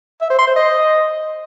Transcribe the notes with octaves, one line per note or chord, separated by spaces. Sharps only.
E5
C5
C6
C5
D#5